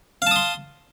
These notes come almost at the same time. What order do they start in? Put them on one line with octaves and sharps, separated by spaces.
F5 A5 D#6 C6